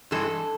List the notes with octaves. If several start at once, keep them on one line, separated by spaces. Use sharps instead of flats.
G2 E3 G#3 A4